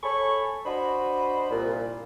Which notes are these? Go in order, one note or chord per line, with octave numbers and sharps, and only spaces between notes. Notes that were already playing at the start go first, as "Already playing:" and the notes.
A4 C#5 G#5 B5 C#6
D4 F#4 C5 D#5 B5
C2 A#2